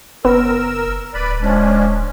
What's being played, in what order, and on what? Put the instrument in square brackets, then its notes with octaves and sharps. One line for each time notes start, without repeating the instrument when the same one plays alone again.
[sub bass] F#1 [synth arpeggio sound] B3 [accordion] A#4 E6
[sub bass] D1 [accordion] B4 D5 B5
[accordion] F3 C#4 D4 [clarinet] G#3